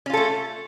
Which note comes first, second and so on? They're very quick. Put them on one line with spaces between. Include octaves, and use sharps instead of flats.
C#4 F4 A4 A3